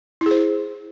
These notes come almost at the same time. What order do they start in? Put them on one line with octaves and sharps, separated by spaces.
E4 G#4 C5